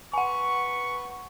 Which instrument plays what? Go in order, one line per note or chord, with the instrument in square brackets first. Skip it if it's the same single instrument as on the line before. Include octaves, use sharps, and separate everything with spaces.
[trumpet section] B4 C#6 [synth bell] F#5 G#5